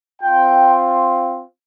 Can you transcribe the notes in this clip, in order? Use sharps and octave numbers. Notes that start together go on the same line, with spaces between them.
C4 F4 G5